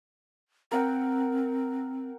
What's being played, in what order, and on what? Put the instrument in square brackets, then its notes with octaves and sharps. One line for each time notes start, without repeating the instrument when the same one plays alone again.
[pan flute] C4 [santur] A#4 F#5 G5